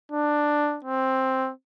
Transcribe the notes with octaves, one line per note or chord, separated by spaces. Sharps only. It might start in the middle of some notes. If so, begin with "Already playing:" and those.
D4
C4